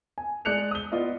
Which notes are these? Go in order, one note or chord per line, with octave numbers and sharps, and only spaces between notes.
G#5
G#3 D5 F#6 C#7 F7
D#6 G7
B3 F4 D5 D#5